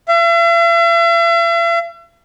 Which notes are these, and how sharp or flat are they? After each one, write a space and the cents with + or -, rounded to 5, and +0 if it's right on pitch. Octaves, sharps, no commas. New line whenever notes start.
E5 +45